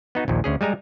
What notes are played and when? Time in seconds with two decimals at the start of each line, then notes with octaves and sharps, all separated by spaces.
0.15 B3 D#4 F#4
0.28 A#1 D#2 A#2
0.44 D2 C#4 G#4
0.61 G3 G#3 G#5 A#5